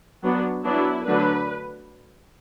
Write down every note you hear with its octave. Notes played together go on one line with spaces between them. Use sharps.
F#3 B3 D4
F#3 B3 D4 E4
D3 F#3 A3 D4 B4